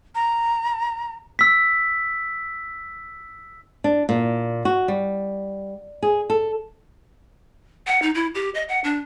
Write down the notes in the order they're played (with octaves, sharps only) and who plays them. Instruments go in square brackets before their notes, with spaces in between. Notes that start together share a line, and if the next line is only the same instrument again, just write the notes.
[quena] A#5
[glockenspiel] E6 B6
[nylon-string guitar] D4
A#2
F#4
G3
G#4
A4
[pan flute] F#5
D#4
E4
G4
D#5
F#5
D4